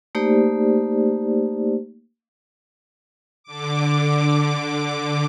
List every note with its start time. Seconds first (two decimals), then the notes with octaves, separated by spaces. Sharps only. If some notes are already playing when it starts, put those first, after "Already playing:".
0.15 A3 A#3 D#4 G4 C5 D5
3.43 D3 D6